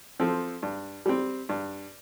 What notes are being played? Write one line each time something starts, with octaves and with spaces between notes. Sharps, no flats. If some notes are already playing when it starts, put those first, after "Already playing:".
F3 C4 A4
G2
G3 C4
G2